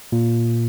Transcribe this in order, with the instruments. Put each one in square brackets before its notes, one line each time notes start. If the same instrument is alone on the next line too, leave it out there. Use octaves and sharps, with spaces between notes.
[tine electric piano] A#2